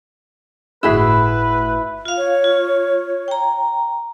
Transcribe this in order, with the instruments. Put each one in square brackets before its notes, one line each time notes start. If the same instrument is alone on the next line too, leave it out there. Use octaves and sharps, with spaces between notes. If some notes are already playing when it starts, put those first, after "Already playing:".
[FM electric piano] G1 A2 E6 [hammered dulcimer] E4 [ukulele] F#4 G#4 E5 [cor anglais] B4
[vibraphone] F4 F5
[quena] C#5
[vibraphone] F4
G5 A#5